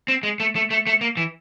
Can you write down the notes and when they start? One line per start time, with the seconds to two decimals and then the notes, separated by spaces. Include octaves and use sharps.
0.08 C4
0.23 G#3
0.40 A3
0.55 A3
0.71 A3
0.87 A3
1.01 A#3
1.17 E3